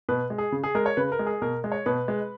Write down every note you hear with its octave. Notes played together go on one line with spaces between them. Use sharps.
B2 B4
G#3
G#4
C#3
G#4
G#3 A#4
C#5
C#3 B4
A#4
G#3
G#4
B2 A#4
G#3
C#5
B2 B4
G#3